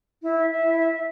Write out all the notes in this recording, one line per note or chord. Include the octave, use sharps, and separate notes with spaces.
E4
E5
E5
E4
E5
E5